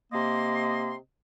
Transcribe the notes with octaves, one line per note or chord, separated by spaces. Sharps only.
C3 A#3 D#5 C6